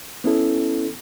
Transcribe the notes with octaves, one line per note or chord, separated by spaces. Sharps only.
B3 C#4 E4 A4